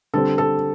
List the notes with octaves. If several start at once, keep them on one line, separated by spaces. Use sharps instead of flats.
D3 G3 C4 A4
A4